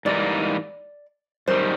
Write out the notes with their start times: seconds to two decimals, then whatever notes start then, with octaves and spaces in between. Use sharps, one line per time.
0.05 G#2 E3 G3 A#3 D#4 D5
1.48 F#2 D#3 G3 C5